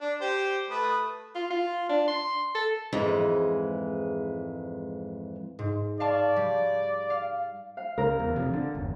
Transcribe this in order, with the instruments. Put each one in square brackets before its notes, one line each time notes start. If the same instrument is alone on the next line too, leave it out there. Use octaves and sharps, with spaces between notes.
[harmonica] D4
G4 C5
A3 B4 D#6
[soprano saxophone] F4
F4
D4
C6
A4
[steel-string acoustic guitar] F2 G#2 E3 G#3
[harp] G#2
[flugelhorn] D5 [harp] F5 A5 C#6
[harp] G3
F5
F5
[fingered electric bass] C#2 [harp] A#4
[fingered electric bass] E2
F1 F2 C3
D3
G1 E2